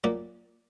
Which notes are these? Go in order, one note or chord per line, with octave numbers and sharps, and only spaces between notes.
A#2 F#3 A#3 D5